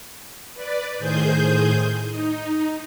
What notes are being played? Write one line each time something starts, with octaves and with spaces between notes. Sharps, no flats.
B4 D5
A2 D#3 G#4 C5 G#5 G6
D#4